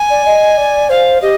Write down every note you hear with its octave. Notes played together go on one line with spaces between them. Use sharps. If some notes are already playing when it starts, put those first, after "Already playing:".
Already playing: G#5
D5
D#5
D5
C5 F5
G4 D#5